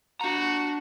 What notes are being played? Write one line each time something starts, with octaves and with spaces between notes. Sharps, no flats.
D4 F#4 A#5